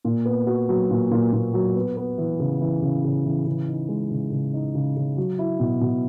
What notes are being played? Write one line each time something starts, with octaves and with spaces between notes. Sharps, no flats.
A#2
B3
F#4
F#3
A#2
A#2
A#2
F#3
B3
B3
E3
C#3
E3
C#3
C#3
E3
C#3
D#4
G#3
C#3
C#3
D#4
C#3
C#3
F#3
E4
B2
B2